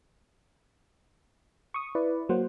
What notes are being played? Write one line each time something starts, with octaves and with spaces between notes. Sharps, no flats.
C#6 D#6
E4 B4 D5
F#3 A#3 C5 F#5